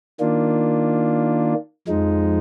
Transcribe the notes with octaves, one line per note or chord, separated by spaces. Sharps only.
D#3 A#3 D4 F4
F2 F3 G#3 D#4